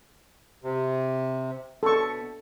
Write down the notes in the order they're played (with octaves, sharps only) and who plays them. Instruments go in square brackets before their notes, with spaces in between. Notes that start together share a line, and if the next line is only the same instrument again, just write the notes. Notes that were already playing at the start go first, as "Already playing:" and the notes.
[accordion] C3
[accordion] B2 [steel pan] A4 C#6